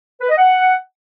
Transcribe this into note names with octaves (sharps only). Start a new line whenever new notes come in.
B4
D#5
F#5